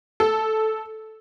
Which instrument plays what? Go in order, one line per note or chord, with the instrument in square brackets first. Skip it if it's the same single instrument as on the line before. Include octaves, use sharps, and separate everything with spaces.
[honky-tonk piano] A4